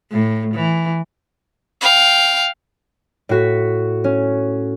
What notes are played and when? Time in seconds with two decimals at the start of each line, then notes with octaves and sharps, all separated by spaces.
0.12 A2
0.55 E3
1.81 F5 G5
3.29 A2 F#4 B6
4.04 C#4